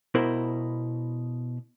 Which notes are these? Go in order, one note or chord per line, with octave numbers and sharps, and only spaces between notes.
B2 E4 A#4 C5 B5